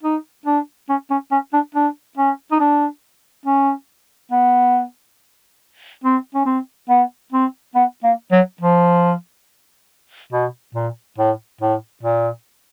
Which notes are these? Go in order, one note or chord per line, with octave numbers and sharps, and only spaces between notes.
D#4
D4
C#4
C#4
C#4
D4
D4
C#4
D#4
D4
C#4
B3
C4
C#4
C4
B3
C4
B3
A#3
F#3
F3
B2
A#2
A2
A2
A#2